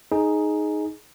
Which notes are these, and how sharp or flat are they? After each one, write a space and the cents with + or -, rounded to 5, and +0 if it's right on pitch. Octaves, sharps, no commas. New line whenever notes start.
D#4 +0 G#4 +10